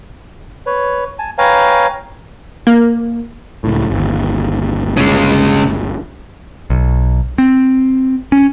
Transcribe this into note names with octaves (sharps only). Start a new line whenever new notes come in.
B4 C#5
G#5 A5
B4 C#5 F5 G5 G#5 A#5
A#3
C#2 A2
G1 D#2
C#3 G#3
B1
C4
C#4